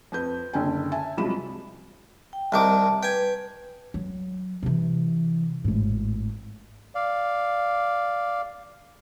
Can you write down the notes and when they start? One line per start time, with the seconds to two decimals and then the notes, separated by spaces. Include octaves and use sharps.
0.12 F2 B4 G6
0.53 F#1 D3 D4 G5 G#5
0.92 E5 G#5 A5
1.18 C2 F3 F#3 G#3 B5 E7
2.33 G5
2.52 C2 D#3 A5 D6
3.03 B4 G5 G#5
3.94 F#3
4.63 C3 E3
5.64 G#1 A2
6.95 D5 F5